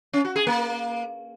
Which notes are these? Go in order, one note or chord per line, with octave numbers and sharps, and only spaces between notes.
C#4
F#4
G#4
A#3